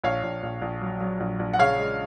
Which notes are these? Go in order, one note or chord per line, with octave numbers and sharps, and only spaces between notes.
A#1 C#5 F5
A#1
A#1
A#1
F#3
F#3
A#1
A#1
F#5
C#3 C#5 F5
G#3